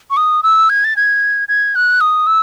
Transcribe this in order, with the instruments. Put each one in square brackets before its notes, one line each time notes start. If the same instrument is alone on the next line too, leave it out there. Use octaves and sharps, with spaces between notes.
[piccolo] C#6
D#6
E6
G#6
A6
G#6
G#6
F#6
D#6
E6